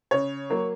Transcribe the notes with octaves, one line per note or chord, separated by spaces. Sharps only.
C#3 C#5
F#3 A#3